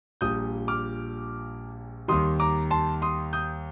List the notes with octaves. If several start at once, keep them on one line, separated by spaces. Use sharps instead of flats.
A#1 A#2 G3 D#6 G6
D6 F6
D#2 D#3 G3 C6 D#6
A#5 D6
A5 C6
C6 D#6
D#6 G6